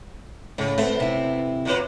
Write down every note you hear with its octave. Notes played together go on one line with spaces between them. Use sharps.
A2 C#3
A3 B3 C4
C3 E4
A#2 F#3 B4